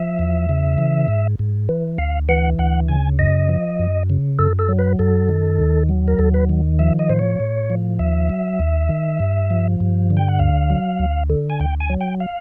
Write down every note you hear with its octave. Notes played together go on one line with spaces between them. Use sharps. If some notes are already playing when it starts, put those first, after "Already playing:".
Already playing: F3 E5
E2
C#3
E3
G#2
G#2
E3
D2 F5
E3 F#5
D2 F#5
C#3 G#5
F#2 D#5
F3
F#2
C#3
F#2 A4
A4
F#3
B4
F#2 A4
D#3
D#2
F#3
A#4
D#2 A4
B4
D#3
F3 E5
D#5
A2 C5
C#5
A2
F3
D#2 E5
F#3
D#2
D#3
G2
F3
G2
D3
G5
F#5
D2 F5
F#3
D2
D3
G#5
D2 G5
G#5
F#3
G5
F5